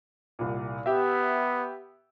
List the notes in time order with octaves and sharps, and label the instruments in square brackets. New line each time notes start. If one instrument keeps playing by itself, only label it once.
[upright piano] C2 A#2
[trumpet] B3 [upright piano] G4 E5